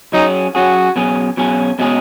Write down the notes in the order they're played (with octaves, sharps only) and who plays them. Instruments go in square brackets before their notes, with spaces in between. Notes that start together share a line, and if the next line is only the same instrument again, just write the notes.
[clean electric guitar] F#3 C#4 G#4 [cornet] D#4
[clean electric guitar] F#3 C#4 G#4 [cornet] F#4
[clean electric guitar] B2 F#3 C#4 G#4
B2 F#3 C#4 G#4
B2 G#3 C#4 G#4